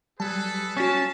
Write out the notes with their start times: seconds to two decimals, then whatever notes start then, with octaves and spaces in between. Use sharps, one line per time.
0.20 F#3 G3 G#4 A4 B4 A5
0.77 C#4 F#4 F5 A5 C#6 B6